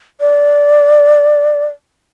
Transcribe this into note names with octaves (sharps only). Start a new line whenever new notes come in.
D5